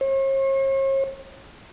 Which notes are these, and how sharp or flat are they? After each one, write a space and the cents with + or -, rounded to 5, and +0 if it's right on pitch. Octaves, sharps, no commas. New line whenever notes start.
C#5 -45